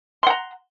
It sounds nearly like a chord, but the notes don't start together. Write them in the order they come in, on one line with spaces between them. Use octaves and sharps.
C6 F#5 A#5